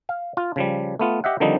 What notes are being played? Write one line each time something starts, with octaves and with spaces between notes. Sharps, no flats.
F5
F4
C#3 F3 G3
A3 B3 F4
G4 D#5 E5 F#5
D3 D#3 F3 G3 C4 D#4